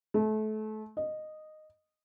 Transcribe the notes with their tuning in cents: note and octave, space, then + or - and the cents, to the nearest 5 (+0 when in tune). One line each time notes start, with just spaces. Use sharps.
A3 -30
D#5 -10